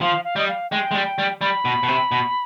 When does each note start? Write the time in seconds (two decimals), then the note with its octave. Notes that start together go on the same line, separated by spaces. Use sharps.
0.01 F3 F5
0.25 F5
0.36 G3 D#5
0.48 F5
0.71 G#3 G5
0.91 G#3
0.94 G3
1.18 G3
1.41 G3 B5
1.65 B2
1.83 B2
1.88 C3
2.12 B2